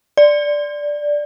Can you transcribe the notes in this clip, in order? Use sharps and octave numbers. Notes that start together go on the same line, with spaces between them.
D5